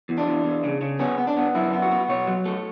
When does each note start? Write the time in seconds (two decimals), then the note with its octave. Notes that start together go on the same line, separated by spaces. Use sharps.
0.09 E2
0.18 D4
0.27 E2
0.44 E2
0.64 C#3
0.81 C#3
0.99 B3 C#4
1.18 B3
1.27 D4
1.37 B3
1.55 F#2 E4
1.73 B3
1.82 F#4
1.91 B3
2.09 B2 C#5
2.27 F#3
2.46 A3